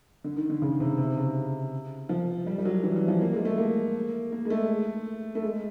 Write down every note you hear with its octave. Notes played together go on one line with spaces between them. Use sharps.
D3
D#3
D3
C#3
C3
C3
C#3
F3
G3
G3
F#3
E3
E3
F3
A#3
G#3
A3
A#3
A#3
G#3
A3
A3
G#3